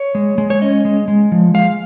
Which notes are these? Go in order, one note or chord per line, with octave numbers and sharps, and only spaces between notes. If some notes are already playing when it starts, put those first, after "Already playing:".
Already playing: C#5
G#3
G#3
C#5
C#4 D#5
G#3
G#3
F3
G#3 F5